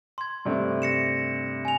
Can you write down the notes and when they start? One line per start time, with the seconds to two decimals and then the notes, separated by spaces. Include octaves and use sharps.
0.18 C6 G#6
0.45 G2 C3 A3
0.82 A#6 C#7 E7
1.65 G#5 F7